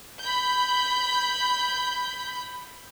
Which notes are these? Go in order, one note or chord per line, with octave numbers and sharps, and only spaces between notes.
B5 G6